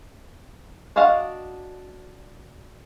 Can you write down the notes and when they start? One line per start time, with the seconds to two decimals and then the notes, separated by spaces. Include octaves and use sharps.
0.96 D4 F#4 D#5 F5 F#5